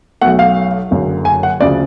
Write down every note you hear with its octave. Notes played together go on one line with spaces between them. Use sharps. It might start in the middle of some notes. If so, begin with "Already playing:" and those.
B1 B2 A3 F#5
F5
F#1 F#2 D3
G#5
F#5
D2 C#3 F3 D5